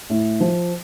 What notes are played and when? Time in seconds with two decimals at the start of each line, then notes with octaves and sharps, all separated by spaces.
0.10 A2
0.40 F3